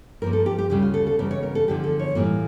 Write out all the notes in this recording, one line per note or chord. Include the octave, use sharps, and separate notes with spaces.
G2 F3 A#3 A#4
A4
G4
G4
D2 C#3 G3 G4
F4
A4
A4
E2 C#3 G3 A#4
C#5
A#4
A4
E2 D3 F3 G4
A4
C#5
A2 E3 G3 A#3 F4